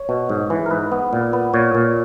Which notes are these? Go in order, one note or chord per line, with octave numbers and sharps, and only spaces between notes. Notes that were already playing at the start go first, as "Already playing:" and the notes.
Already playing: C#5
B2
G#2
E3
A#4
G#2 B4
B3
A#2
B3
A#2 C#5
A#2